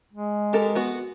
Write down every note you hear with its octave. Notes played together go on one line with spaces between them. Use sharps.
G#3
G4 A4 A#4
B3 F#4